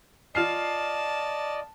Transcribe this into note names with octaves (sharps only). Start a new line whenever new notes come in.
F4 D5 D#5 A5 F6 C7